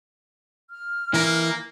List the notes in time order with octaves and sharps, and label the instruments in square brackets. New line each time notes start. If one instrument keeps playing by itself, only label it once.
[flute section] F6
[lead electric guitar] E3 A#4 [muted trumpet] A#3